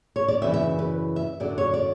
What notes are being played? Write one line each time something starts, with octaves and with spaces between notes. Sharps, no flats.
C#5
D5
F#2 C#3 E3 E5
E5
B4
E5
F#2 D3 D5
C#5
D5